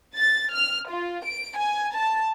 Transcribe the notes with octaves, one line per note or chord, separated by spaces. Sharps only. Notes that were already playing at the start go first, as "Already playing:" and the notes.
A6
F6
F4
D7
G#5
A5